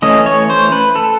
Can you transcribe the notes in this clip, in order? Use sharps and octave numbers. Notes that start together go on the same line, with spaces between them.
E3 A3 C#4 D#5
C#5
C5
B4
A4